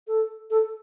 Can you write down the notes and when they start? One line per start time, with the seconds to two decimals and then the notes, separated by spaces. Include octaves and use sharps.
0.08 A4
0.51 A4